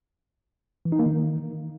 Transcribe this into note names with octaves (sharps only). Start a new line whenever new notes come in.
E3
D#4
A#3
D#3